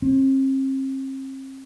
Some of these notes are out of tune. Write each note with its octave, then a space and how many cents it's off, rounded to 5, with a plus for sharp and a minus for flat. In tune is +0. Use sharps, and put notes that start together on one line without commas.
C4 +40